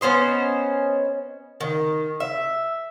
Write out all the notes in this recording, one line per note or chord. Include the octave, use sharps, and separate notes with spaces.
B3 C#4 C5 D#5
D#3
E5